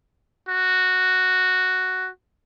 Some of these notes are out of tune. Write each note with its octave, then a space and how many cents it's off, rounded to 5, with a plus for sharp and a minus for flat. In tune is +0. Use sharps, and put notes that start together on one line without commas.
F#4 +0